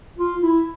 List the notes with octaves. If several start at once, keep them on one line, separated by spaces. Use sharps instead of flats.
F4
E4